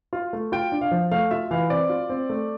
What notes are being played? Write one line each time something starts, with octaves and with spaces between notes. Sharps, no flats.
F4
A3
F4 G5
D4
F5
F3
A3 F5
F4 E5
E3 F5
C4 D5
F4
C4
A3